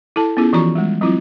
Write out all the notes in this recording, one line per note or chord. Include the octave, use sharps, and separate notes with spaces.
E4 A4 A5
B3 C#4 E4 F4 G#4
E3 F3 F4 F#4 A#5 C#6
G3 G#3
F#3 C4 E4 F4